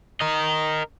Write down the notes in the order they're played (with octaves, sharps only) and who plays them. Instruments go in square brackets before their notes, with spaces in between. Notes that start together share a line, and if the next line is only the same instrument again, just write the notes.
[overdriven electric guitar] A#4 D#5